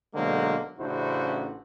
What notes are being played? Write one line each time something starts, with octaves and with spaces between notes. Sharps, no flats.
B1 D3 F#3 G#3 A#3 C5
A1 C#3 D4 E4 F#4 C5